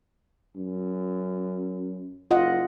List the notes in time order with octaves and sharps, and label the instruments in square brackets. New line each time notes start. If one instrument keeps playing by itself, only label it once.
[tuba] F#2
[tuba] F#1 [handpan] F4 D#5 F#5